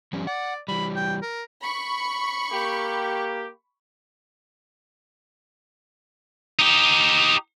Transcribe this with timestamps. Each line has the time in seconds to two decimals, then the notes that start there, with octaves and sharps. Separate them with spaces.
0.13 F3 G3 C#4
0.27 D5 F#5
0.68 E3 G3 B5
0.96 G5
1.22 A#4
1.62 B5 C#6
2.52 A#3 G4
6.59 D#4 G4